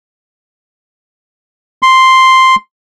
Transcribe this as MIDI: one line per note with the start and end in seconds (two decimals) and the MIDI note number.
1.83 2.55 84